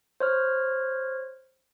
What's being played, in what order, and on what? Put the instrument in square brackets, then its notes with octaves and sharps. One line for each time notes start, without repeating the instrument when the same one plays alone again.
[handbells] C5 C#5 F6